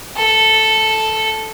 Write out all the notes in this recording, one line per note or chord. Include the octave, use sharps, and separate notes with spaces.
A4